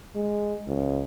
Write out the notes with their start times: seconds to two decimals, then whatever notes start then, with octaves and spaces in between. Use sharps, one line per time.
0.15 G#3
0.68 C#2